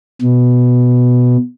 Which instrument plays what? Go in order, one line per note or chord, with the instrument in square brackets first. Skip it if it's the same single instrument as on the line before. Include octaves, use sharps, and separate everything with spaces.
[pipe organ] B2